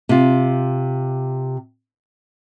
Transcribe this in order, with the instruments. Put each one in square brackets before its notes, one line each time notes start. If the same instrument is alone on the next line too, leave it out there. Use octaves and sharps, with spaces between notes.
[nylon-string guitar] C3 F4